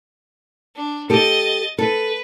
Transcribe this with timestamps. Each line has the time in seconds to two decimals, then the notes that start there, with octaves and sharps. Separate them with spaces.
0.76 D4
1.10 G4 A4 D#5 A6
1.78 A4 B4